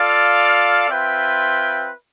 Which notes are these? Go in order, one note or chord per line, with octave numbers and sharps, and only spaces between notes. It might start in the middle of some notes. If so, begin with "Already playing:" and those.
Already playing: F4 A4 D5 F5
C4 F4 B4 E5 G5